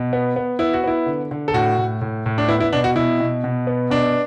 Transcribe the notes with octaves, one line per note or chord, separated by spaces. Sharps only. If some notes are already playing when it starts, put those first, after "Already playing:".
Already playing: B2
B3
B3
B3 E4
F#4
B3 E4
D3
D3
A4
A2 F#4
A2
A2
A2
D4
B3 E4
E4
B2 D4
F#4
B2 E4
B2
B2
B3
B2 D4